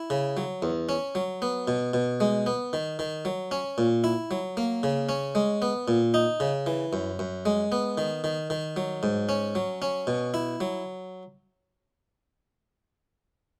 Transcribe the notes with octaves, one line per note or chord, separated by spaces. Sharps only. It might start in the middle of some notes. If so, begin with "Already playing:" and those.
Already playing: E4
C#3
F#3
E2
C#4
F#3
B3
B2
B2
G#3
B3
D#3
D#3
F#3
C#4
A#2
E4
F#3
A#3
C#3
C#4
G#3
B3
A#2
D#4
C#3
E3
F#2
F#2
G#3
B3
D#3
D#3
D#3
F#3
G#2
C#4
F#3
C#4
B2
E4
F#3